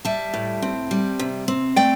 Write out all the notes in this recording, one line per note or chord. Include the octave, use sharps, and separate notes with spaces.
G3 E5 A5
A2
C4
G3
C3
C4
A3 D5 G5